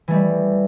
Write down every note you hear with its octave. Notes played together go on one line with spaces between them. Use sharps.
E3 G3 A3